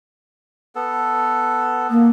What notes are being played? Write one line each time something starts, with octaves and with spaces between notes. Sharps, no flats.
B3 A4
A#3